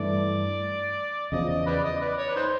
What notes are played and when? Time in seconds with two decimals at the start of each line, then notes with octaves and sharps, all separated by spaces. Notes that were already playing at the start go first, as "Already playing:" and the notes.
Already playing: G2 E3 A3 D5
1.31 E2 C#3 F3 D#5
1.49 D#5
1.66 B4 D5
1.84 D#5
2.01 B4 D5
2.18 C#5
2.28 B4
2.36 D#4 C5